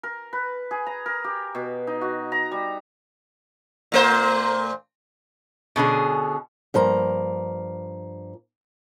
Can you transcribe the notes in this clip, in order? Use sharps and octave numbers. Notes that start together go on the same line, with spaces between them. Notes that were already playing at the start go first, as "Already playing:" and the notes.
A#4
B4
G#4
A#5
A#4
G4
B2
D#4
F#4
A#5
G3
A#2 A3 C5
B2 D3 C#4 G#4
G2 F3 A#3 A#5